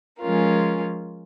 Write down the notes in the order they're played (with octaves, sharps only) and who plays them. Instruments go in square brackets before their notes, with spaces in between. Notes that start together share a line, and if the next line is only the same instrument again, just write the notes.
[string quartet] F3 G#3 C#4 F4 A#4